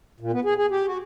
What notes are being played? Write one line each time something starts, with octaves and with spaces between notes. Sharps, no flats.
A#2
B3
G#4
G#4
G4
F#4